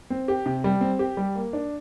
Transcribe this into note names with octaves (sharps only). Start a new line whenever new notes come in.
C4
G4
C3
G3
C4
G4
G3
A#3
D4